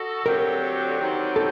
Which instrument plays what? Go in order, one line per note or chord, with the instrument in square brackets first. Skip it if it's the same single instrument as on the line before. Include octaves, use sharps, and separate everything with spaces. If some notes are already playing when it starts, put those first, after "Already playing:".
Already playing: [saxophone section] F#4 A4 D#5
[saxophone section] D2 D3 F#3 C4 G4 [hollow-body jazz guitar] A#4
[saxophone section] D#3 F#3 C4 G4
[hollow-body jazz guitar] A4